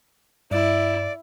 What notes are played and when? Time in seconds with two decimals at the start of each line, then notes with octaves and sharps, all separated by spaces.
0.51 G2 E4 D5